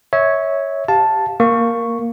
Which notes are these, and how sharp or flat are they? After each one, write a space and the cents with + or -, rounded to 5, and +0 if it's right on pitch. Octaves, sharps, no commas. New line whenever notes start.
C#5 +0 E5 -25
G4 +0 F5 +20 A5 +0
A#3 +0 C#6 +0